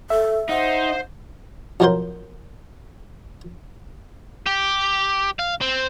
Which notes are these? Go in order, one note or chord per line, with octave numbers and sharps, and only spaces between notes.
A4 E5
D#4 C5 F#5
F2 A2 F#3 A#4 C5 C6
G4
F5
C4